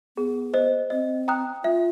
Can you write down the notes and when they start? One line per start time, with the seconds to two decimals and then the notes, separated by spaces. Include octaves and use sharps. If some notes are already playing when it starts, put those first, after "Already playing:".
0.17 B3 G#4
0.54 C5 D#5
0.90 C4 D#5
1.28 G5 A#5 D#6 F#6
1.64 F4 E5